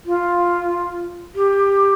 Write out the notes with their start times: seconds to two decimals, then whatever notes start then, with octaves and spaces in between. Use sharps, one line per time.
0.05 F4
1.35 G4